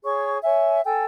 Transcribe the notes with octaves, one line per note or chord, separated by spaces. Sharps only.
G#4 C#5 C#6
C#5 E5 G#5
A4 G5 G#5